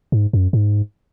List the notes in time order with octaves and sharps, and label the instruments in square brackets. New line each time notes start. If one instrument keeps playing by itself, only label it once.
[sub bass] G#2
F#2
G#2